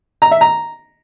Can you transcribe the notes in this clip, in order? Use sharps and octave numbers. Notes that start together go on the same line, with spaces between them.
A#5
E5
A#5